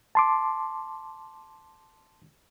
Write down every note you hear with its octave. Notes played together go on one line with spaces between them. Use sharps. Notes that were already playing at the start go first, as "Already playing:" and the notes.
A5 C6 D6